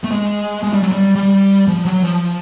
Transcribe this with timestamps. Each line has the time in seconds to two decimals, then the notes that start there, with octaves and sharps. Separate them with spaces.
0.04 A3
0.11 G#3
0.63 G#3
0.73 G3
0.83 F#3
0.92 G3
1.15 G3
1.68 F3
1.85 F#3
2.03 F3